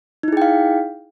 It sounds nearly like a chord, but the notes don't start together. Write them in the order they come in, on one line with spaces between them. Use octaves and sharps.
D#4 E4 G#4 G5 F5